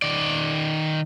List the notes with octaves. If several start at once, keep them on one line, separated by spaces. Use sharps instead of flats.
D#3 D5